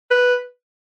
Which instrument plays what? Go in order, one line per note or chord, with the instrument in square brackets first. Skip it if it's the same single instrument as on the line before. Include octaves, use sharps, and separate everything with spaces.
[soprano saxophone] B4